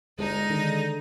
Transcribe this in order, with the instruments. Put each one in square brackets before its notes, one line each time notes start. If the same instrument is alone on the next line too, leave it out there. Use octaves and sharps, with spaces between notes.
[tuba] G1 [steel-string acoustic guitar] G#3 A4 [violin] D#4 A#6
[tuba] D3 [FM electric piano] D#3